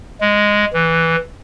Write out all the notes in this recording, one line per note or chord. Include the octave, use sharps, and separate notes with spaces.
G#3
E3